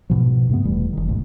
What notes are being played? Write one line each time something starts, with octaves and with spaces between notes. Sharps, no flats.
G#2 B2 F3
G2 C3 A3 B3
E1 E3 G3 A3
F#1 D#3
D2 G#2 B2